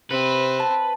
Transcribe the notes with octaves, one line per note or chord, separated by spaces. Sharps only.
C3 C4 B4
A5